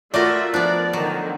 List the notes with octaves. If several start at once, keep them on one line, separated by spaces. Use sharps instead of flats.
A3 F4 F#4 A#4 D5 E5
F3 B3 D4 A#4 D5
D3 D#3 F#3